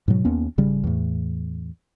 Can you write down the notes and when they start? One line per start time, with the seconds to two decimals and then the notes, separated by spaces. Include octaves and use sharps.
0.08 G#2 B2 F#3
0.25 D#2 A#3 B3 C#4
0.58 G#1 C#3 G3
0.84 E2 A2